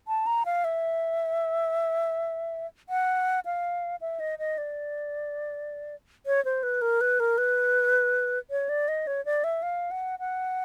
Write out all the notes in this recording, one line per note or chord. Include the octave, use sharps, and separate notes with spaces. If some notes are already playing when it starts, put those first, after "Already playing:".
A5
A#5
F5
E5
F#5
F5
E5
D#5
D#5
D5
C#5
C5
B4
A#4
B4
A#4
B4
C#5
D5
D#5
C#5
D5
E5
F5
F#5
F#5